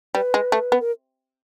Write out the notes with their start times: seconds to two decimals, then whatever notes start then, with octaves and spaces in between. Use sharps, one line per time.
0.15 G3 B4
0.34 G#3
0.52 A3
0.72 B3
0.80 A#4